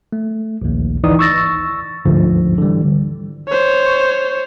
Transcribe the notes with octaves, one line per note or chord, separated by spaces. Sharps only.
A3
A#1 D#2
G#1 D2 E3 D#4 D5 D#6
C#6 E6 A6 A#6
G1 D2 G#2 D3 F3
D3 E3 G3
C5 C#5